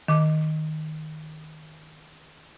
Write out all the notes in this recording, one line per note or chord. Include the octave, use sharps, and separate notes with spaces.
D#3 D6